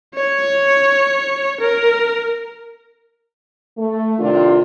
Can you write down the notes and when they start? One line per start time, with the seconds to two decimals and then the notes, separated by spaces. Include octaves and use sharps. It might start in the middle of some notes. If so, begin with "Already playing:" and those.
0.15 C#5
1.60 A#4
3.78 A3
4.19 A2 C3 D#3 D4 F4